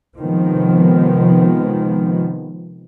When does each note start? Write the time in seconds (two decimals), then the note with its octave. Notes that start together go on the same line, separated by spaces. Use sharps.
0.19 C3 D#3 F3 G#3 B3